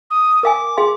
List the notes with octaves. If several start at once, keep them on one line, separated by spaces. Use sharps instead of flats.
D#6
A#4 F5 G#5 D6
G#4 F5 C6